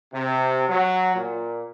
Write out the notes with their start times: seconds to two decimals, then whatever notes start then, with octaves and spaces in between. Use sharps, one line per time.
0.14 C3
0.69 F#3
1.16 A#2